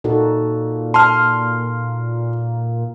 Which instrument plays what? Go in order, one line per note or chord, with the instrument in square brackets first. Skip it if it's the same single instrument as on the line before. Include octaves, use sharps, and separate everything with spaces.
[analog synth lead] A#2 [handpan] D#4 F#4 A4
[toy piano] A5 [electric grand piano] C6 F6